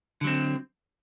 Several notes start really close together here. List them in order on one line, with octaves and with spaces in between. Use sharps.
D3 F#3 C4